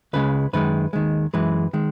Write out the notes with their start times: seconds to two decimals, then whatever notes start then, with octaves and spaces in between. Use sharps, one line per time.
0.13 C#2 C#3 G#3 B4
0.53 F#2 D#3 G#3 B4
0.93 D#2 D#3 G#3
1.34 F#2 E3 G#3 B4
1.73 D#3 G#3